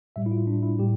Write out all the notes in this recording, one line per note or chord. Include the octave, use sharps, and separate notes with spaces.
A2 G3 E5
E4
F4
D4
E4
A2 G3 G4